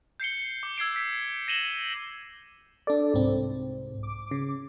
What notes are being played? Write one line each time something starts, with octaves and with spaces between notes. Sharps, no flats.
G6 C7 C#7 G7
D6
E6 G#6 C7 D7 G7
B6
A#6 D#7 E7 F#7 G7
D4 A4 D5
C2 G#2 C4
D6
C#3